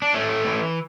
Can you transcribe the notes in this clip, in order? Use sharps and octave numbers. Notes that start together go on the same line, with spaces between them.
D4
A2 A3 C#4
E3